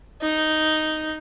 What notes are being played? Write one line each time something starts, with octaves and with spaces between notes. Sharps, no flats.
D#4